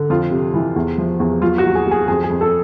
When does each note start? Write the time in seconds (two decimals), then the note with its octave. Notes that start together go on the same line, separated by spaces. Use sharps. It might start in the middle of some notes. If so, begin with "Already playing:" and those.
Already playing: D3
0.10 F2 F4
0.31 C3
0.54 E3
0.76 E2
0.98 F3
1.20 E2
1.42 F#3 F4
1.58 F#4
1.64 D#2
1.75 G#4
1.85 D#2
1.91 G#4
2.08 F2 G#4
2.24 G#4
2.30 F2
2.41 A4